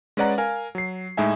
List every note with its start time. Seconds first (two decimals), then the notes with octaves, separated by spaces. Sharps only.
0.17 G#3 C#4 B4 D5 F#5 A#5
0.38 A#4 F5 G#5
0.75 F#3 C7
1.17 A2 G#3 D#4 E5 G#5